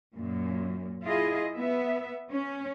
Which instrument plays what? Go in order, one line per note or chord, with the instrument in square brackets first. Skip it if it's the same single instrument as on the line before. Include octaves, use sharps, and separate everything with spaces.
[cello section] F#2 A#2
E4 F4 G#4 D#5
B3 E5
C#4